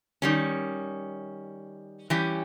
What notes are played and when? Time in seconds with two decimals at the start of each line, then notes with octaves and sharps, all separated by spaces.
0.22 D#3 G3 C#4
2.10 E3 G3 C#4 G4